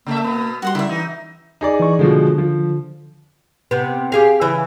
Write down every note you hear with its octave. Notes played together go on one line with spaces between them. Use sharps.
C#3 A3 A#3 E5
B2 B3
G3 F#4 F#5 C6
C#3 E4 E5
E3 D#4
D#4 G#4 D5
E3 C#6
B2 D3 F3 G#3
F3
C3 B3
G4 G#4 F5
C#3 E3 E5